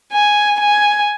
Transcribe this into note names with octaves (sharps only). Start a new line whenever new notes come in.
G#5
G#5